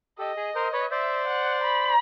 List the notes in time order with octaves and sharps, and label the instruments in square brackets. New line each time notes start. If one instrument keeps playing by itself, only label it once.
[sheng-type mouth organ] G4 A4 [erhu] D#5
[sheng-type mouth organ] G#4
A#4 C5
B4 C#5
[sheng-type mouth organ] C5 D5 [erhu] E5
[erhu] F#5
B5